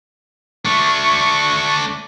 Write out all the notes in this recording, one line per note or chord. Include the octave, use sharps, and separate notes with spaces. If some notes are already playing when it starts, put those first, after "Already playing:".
A3 D4 C#6